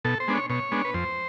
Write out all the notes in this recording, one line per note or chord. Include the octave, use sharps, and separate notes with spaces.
B2 A4
C5
G#3 B3 D4
C#5
B2 C#5
G#3 B3 D4
B4
F2 C5